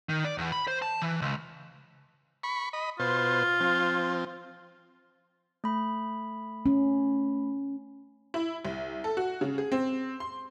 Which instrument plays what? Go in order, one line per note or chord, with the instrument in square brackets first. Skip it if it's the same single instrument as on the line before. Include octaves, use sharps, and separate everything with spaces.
[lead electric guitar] D#3
D5
E2
B5
C5
A5
E3
C#2
[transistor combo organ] B5 C#6
D#5 B5
[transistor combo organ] B2 C5 [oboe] F4
[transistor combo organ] F3 C4
[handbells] A3 B5
[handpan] C#4
[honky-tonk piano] E4
C2
A4
F#4
C#3
G#4
C4
C6